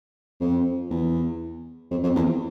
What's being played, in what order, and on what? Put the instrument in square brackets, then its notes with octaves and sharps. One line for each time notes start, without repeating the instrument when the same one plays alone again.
[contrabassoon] F2
E2
F2
F2
E2